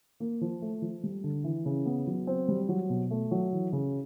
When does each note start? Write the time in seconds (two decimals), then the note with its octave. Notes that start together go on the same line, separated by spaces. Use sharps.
0.20 A#3
0.41 F3
0.62 A3
0.82 F3
1.04 G3
1.24 D3
1.44 E3
1.66 C#3
1.86 B3
2.07 F#3
2.27 C4
2.48 G3
2.69 F#3
2.90 B2
3.11 A3
3.31 F#3
3.52 E3
3.73 C#3